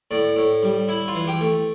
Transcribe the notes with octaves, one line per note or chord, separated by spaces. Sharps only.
A2 D5
A2
G3
E4
F4
E3
G4
A3